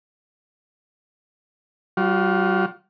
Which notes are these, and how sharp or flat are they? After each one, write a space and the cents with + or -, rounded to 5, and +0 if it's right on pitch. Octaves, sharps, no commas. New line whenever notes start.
G3 -45 F4 +20